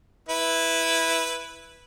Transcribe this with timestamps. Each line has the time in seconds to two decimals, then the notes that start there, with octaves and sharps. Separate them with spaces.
0.29 E4 B4